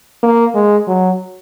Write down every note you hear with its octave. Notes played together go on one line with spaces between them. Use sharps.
A#3
G#3
F#3